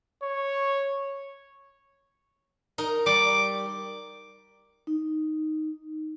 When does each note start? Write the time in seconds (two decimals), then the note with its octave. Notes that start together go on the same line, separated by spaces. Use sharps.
0.23 C#5
2.78 D#4 A#4
3.06 G3 D6
4.87 D#4